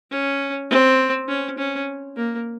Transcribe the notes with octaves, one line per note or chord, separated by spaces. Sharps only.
C#4
C4
C#4
C#4
A#3